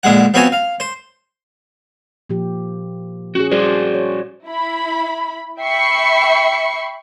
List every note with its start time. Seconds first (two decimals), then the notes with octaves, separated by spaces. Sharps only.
0.03 A#1 D3 G#3 F#5
0.34 F3 B3 C4 F#4 C#5 G#5
0.52 F5
0.80 C5
2.30 A#2 F3 G4
3.35 C#4 F#4 G#4
3.51 G3 F#4 G#4 C5 D5
3.94 C#5
4.47 E4 B5
5.60 E5 G5 B5 C#6 C7 C#7